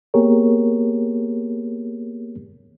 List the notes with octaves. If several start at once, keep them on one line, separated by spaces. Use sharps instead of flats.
A#3 B3 G4 G#4 A#4 C#5